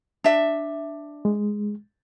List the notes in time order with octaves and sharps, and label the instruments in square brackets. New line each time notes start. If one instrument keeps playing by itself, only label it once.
[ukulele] D4 E5
[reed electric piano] G#3